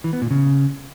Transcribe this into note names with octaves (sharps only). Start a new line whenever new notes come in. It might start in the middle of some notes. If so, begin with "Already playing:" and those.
E3
B3
A#2
C#3